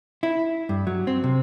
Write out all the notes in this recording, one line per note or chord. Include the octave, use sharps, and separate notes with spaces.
E4
G2
F#3
C4
C3